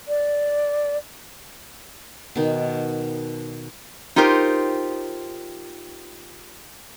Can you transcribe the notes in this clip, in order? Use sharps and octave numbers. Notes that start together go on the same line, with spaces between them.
D5
B2 D#3
D#4 F4 G4 A#4 C5